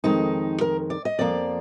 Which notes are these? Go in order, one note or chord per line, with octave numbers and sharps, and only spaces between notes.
F2 D#3 G#3 D#4
A#4
D5
D#5
F2 F3 A#3 D5